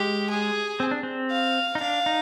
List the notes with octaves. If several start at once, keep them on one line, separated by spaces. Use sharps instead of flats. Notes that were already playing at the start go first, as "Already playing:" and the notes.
Already playing: G#3 G4
G#4
C4
D4
C4
F5
D#4
D4 F5
D#4